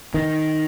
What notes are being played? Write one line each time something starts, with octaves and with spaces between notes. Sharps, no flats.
D#3